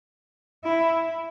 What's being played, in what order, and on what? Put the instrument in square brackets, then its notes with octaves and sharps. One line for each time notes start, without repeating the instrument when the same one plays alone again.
[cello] E4